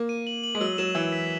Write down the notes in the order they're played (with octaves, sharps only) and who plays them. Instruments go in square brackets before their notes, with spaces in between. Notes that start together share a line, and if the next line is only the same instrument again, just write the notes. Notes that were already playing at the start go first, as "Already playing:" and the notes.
Already playing: [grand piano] A#3
[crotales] D#7
F#7
F#7
[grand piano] G#3
[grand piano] F#3 [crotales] E6
[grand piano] F#3 [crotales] E7
[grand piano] E3 [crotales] E6
[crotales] B6